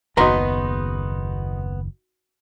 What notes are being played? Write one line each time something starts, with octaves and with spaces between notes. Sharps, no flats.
F#1 D#2 B3 D#4 F#4 B4 A#5 C6